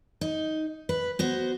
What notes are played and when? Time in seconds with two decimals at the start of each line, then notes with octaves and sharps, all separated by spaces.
0.21 D#4
0.89 B4
1.19 B3 F#4 C5